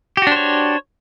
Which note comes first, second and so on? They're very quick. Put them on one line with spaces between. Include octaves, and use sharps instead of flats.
G4 F#4 D4 C5 C#5